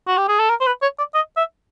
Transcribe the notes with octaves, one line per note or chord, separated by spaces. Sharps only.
F#4
G4
G#4
A4
A#4
C5
B4
C#5
D5
D#5
E5